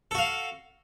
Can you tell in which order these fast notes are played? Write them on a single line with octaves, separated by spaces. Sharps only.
A4 F#4 F5